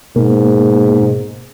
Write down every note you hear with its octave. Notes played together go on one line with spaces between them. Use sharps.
G#2 B2 A#3